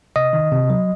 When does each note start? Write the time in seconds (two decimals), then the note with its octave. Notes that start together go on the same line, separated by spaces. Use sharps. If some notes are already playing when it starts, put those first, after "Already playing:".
0.16 C3 D#5
0.33 D#3
0.52 C3
0.70 F#3